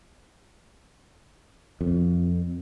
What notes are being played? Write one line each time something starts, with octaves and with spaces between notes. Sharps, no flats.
F2